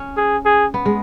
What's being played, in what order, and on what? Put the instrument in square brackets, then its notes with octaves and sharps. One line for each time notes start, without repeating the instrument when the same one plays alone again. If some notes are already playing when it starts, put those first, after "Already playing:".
Already playing: [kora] C#4
[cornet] G#4
G#4
[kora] B3
G#3